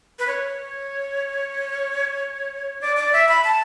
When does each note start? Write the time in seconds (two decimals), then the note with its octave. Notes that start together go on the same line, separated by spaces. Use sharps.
0.19 B4
0.27 C#5
2.81 D5
2.97 D5
3.13 E5
3.29 B5
3.44 A5